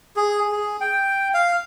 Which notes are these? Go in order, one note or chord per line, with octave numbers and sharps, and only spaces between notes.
G#4
G#4
G5
F5